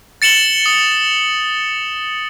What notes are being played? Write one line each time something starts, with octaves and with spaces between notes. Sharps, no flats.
A6 C#7 E7 F#7 G7
D#6